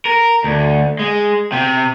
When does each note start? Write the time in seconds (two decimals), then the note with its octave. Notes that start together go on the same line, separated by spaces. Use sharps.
0.05 A#4
0.44 D2
0.99 G#3
1.52 C3